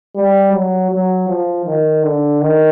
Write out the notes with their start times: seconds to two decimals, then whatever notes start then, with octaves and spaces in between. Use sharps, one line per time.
0.16 G3
0.53 F#3
0.91 F#3
1.28 F3
1.66 D#3
2.04 D3
2.41 D#3